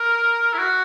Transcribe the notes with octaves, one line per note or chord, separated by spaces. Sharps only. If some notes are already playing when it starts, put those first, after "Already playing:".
Already playing: A#4
E4
F#4